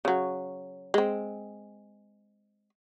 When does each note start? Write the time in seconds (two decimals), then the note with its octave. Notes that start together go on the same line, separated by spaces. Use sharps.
0.05 C#3 F#3
0.94 G#3 C4